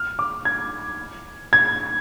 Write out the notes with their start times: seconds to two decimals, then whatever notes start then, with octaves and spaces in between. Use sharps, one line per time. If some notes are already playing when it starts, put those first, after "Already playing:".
Already playing: F6
0.19 D6
0.45 G#6
1.53 G#6